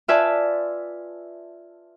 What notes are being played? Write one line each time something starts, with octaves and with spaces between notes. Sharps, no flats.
F4 B4 D5 E5 G#5 A5